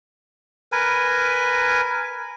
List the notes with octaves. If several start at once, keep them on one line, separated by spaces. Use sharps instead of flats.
A#4 B4 G#5